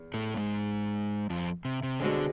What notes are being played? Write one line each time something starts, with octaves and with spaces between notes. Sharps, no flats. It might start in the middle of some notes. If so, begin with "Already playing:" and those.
Already playing: E2
A2 A3
G#2 G#3
F2 F3
C3
C3
C2 B2 D3 G#3 C4 G#4